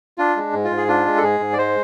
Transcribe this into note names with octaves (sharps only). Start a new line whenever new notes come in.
D4 F4
G#3
G#2
F4
G#2
G#4
D4 F4
G#3
A4
G#2 G#4
G#2
D5
G#3 C5